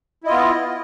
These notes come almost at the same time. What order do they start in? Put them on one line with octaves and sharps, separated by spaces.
E4 D#5 F4 B3